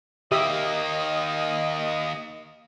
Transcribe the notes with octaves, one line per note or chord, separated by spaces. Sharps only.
D#3 A#3 G4 D#5 E5 D#6